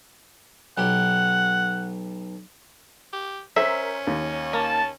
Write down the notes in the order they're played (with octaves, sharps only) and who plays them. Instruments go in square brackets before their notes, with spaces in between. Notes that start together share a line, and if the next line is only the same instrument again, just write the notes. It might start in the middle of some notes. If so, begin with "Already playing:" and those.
[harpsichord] B1 G4 [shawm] F#5
[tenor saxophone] G4
[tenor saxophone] C#4 [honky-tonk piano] A#4 C5 B6 [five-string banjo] E5
[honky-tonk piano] D#2
[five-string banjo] A#3 [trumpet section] A5